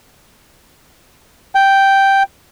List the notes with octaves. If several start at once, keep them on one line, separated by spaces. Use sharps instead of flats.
G5